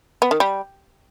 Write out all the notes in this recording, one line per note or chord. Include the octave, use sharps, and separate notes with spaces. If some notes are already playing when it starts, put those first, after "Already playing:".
B3
D#3
G3